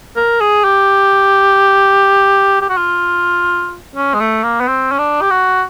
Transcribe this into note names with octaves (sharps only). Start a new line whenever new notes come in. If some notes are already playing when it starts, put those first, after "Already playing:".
A#4
G#4
G4
G4
F#4
F4
C#4
G#3
A3
A#3
B3
C4
C#4
D4
G4
F#4